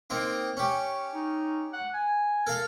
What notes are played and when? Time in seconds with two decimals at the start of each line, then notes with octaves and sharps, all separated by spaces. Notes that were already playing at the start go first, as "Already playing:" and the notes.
0.10 A#3 C4 D#4
0.57 C#4 G4
1.14 D#4
1.73 F#5
1.94 G#5
2.47 A4 A#4 F5